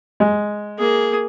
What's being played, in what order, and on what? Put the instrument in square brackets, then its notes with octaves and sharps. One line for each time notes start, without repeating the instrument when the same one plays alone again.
[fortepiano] G#3
[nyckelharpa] A#3 G#4